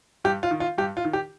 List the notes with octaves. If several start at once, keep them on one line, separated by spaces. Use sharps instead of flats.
G2 G4
F4
D#3
F4
G2 G4
F4
D#3
G4